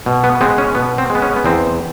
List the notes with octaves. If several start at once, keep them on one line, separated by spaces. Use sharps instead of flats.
B2
B3
G#3 B3 C4
C#4
B2 B3
C4
G#3
B3
C#4
B3
E2 C4